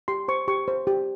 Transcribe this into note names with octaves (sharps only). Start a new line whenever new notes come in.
G4 C6
C5 C#6
G4 C#6
C5
G4